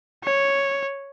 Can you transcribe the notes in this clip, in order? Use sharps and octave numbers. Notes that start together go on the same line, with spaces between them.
C#5